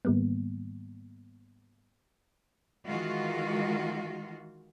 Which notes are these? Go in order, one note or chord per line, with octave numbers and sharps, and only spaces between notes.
G#2 D#3 G3 A#3 B3
D#3 E3 G#3 F4 F#4